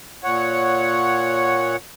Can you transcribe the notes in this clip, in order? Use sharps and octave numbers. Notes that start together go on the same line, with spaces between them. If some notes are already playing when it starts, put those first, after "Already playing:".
A#2 C#5 F#5